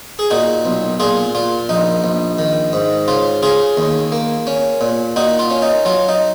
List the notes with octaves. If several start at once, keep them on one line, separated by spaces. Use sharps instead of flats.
G#4
A#2 D#4 F#4
B1
A#2 F4 G#4
A#2 F4
A#1 D#4
A#1
D#3
G#2
C#3 F4
C#3 F4 G#4
D#2
A#3
C#4
A#2
A#2 D#4 F#4
F4
C#4
D#4
F#3 F4
D#4